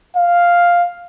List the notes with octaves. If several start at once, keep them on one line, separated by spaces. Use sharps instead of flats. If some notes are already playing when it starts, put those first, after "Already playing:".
F5